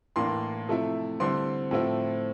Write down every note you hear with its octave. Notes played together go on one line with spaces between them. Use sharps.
A2 E3 A#3 D4 C6
C3 F3 A3 E4
D3 G3 C4 E4 C6
A2 F3 A3 C4 E4